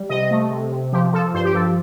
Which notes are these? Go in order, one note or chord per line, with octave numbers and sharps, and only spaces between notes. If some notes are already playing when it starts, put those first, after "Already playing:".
Already playing: G3
C3 D#5
A3
C3
C3
F3 G4
F3 A4
G2 C5
G4
F3 A4